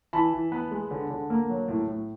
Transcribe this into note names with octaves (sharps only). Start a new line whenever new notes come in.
E3 A5 B5
E3
B3
G#3
D3
D3
A#3
F#3
A2
A2